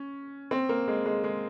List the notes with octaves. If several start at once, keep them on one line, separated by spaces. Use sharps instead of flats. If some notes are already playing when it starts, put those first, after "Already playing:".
Already playing: C#4
C4
A#3
G#3
G#3
G#3